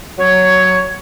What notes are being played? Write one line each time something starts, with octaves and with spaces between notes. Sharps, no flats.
F#3 C#5